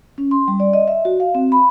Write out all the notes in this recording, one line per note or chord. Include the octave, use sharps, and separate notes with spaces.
C#4
C6
G3
D5
D#5
E5
F#4
F5
C4
B5